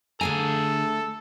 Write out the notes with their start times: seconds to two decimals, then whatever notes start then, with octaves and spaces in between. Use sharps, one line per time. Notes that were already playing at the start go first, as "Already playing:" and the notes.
0.21 D3 A3 G#4 A4 G#5 A#5